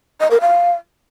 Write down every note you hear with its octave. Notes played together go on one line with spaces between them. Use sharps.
D#5
A#4
F5